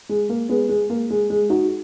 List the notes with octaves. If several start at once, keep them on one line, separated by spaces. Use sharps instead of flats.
G#3
A#3
G#3 B3
G#3
A#3
G#3
G#3
D#4 F#4